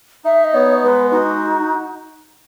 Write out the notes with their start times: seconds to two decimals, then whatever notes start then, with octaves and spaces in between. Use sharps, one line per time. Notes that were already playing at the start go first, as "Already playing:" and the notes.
0.25 D#4 E5
0.45 D#5
0.54 B3 C#5
0.83 G#3 B4
1.11 D#4 F#4